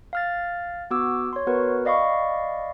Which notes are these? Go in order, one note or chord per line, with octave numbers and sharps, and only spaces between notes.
F5 F6 A6
B3 F#4 D6 E6
C#5 C6
B3 F#4 A#4 B4
D5 D#5 F5 B5 C#6